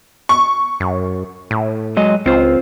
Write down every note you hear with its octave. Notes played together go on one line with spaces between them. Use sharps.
C#6
F#2
A2
F#3 G#3 D#5
C#2 C4 F4 C5